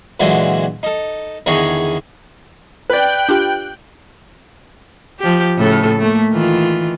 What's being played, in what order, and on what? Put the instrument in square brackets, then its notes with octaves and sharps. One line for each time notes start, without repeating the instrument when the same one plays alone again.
[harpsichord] A#2 D3 E3 F#3 G#3
D#4 A4
E2 D3 D#3 D#4 G#4 C#5
[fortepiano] B4 D5 [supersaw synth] G5 F#6
[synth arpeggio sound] D4 F4 G4
[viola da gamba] F3 G4
A2 C#3 A4
A3 A#3
D#3 E3 F4